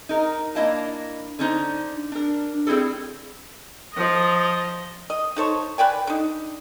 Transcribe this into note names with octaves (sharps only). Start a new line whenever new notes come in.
D#4 A#4
A#3 D4 E4 D#5 F5 A5
D3 C#4 D#4 C5
D4 A#4
G3 C4 E4 G#4 A4
F3 D#5
D#5
D#4 A4 C5 C#5
B4 D5 G5 G#5
D3 D#4